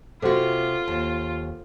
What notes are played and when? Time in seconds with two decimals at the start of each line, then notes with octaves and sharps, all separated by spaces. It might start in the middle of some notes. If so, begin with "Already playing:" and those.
0.22 C3 F4 F#4 A4 C5 F#5
0.88 D#2